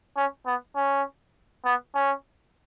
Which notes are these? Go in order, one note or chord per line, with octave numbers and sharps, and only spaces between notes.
C#4
B3
C#4
B3
C#4